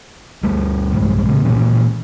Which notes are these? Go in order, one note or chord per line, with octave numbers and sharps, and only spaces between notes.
D2 G3 A3
B1 G2 G3 G#3
A2 C#3
A#2 E3 C#4